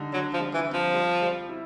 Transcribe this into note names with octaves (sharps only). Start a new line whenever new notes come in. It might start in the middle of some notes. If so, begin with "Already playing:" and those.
Already playing: D3 G3 D#4
D3 F#3
F3
G3
E3
C4
F3
G3
G3
E4